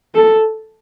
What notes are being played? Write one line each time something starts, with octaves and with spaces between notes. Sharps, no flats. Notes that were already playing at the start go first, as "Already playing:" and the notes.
A4